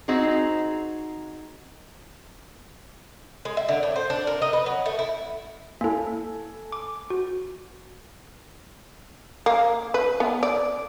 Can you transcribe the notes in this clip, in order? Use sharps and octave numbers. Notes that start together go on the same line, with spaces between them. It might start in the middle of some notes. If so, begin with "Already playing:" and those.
C4 D#4 F#4 G#4
G#3
E5
D3
A2
C5
D4
A#4
D#5
B4
F#3
A3
E4
A#3 E4 A4 G#5
D6
F#4
A#3
B4
B3
D5